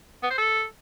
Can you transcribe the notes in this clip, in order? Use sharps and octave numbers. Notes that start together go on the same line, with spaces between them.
B3
C5
A4